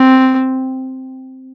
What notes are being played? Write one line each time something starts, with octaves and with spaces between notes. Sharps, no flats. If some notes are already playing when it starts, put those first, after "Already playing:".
Already playing: C4